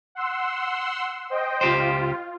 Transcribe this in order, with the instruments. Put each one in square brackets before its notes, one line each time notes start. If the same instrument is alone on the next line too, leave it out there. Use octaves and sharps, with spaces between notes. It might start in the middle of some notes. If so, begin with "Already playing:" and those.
[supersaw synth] F#5 C6 E6
C5 D#5 G5
[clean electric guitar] C#2 G4 C5 [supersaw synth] F4